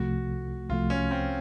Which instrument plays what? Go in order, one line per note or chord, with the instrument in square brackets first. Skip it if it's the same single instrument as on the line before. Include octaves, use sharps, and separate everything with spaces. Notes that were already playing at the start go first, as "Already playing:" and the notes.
Already playing: [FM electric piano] C2 C3 F3 A3 [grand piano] F#4
[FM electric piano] C2 C3 F3 A3 [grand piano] F4
[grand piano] C#4
C4